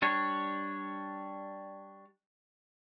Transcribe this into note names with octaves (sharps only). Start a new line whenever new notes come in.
G3 D4 C#5